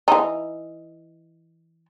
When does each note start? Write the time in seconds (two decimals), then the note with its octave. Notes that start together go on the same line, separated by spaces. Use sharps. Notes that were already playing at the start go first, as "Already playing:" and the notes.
0.08 E3 D#4